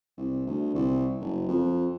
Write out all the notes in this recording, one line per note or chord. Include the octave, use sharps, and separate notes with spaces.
C2
D2
C2
F#1
F2